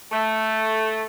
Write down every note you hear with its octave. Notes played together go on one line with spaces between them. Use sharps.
A3